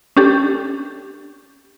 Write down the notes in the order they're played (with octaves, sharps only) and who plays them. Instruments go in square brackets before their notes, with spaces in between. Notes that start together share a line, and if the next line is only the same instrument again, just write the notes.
[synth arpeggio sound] C#4 D4 G4 A4